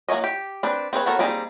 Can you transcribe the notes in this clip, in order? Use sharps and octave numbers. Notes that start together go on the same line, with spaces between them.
F#3 A#3 F4 C#5 D#5
G4
C4 D4 B4
C4 G#4 B4 C#5
B3 F#4 A4 A#4 C#5
G3 A#3 C4 D#4 G#4